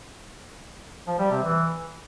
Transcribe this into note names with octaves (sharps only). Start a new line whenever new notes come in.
F3
G3
C3
E3